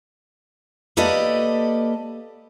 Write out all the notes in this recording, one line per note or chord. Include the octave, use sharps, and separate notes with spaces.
A#3 G4 A4 B4 D5 D#5